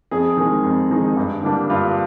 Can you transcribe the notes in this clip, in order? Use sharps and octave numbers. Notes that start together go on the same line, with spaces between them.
F2 G#4
D#3 G#3 D#4
F2
D#3 G#3 D#4
G2
D3 G3 A#3 D4
G2 F4